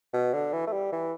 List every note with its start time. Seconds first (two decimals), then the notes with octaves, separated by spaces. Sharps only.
0.13 B2
0.34 D3
0.53 E3
0.67 A3
0.73 G3
0.92 E3